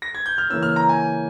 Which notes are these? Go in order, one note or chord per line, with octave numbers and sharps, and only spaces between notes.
A#6
G#6
G6
F6
C#3 E3 A#3 C#4 E6
F6
A#5
G#5